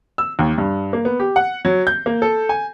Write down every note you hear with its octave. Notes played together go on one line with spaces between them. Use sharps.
E6
D#2
G2
A#3
B3
G4
F#5
F#3
G6
A#3
A4
G#5